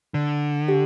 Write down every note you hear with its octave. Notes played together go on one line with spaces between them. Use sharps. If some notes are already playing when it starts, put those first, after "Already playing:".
D3
G4